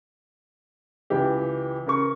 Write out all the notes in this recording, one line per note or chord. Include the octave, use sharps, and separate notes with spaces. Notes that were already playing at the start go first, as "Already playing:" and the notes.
C#2 E3 G4
C#3 A#4 C#6